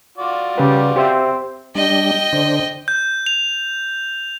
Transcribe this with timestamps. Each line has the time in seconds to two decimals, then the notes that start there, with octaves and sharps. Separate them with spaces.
0.18 F4 F#4 D5
0.58 C#3 G3 G#4 B4
0.96 C4 G4 C5 E5
1.75 G3 D4 D#5 G5
2.33 D3 D4 C5
2.88 G6
3.26 F7